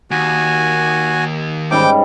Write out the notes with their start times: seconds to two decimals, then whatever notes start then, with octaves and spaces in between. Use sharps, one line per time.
0.11 D#2 F#4 G#5
1.71 G#2 C#3 G3 G5 D6